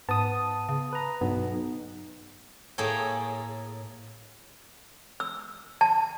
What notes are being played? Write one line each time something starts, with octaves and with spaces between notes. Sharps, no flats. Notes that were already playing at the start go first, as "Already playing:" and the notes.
G#2 B3 A5 D#6
C#3
B4 A#5
B1 G2 B3
A2 A#3 G#4 A4 C#5 G5
E6
A5